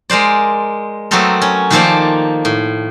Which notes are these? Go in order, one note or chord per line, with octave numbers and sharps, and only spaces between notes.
G#3 A#4 C5 D5
F#3 A3 B3 C4 A4 A#4
C#4
D#3 F3 A#3 A4 C5 D5
A2